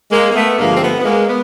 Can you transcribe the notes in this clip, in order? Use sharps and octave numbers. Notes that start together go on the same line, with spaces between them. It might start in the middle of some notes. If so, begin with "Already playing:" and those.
G#3 A#3
A#3
A3 B3
G2 D3 F3 G#3 A#3
C4
A3 B3
B3
G#3 A#3
B3